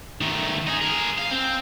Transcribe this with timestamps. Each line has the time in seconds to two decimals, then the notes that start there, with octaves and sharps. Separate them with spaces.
0.21 D#3 A3
0.67 D#4 G#4
0.81 G#4 A#4
1.18 F5
1.31 C4